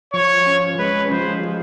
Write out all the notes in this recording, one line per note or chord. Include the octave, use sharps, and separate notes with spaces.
F3 C#5
C#4
G#3 B4
F3 C5
G#3